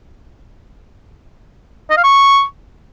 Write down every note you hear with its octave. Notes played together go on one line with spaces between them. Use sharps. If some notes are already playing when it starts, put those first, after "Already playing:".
D#5
F5
C#6